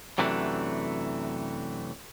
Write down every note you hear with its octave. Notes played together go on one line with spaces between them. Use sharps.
F#2 C3 E3 F#3 A3 D4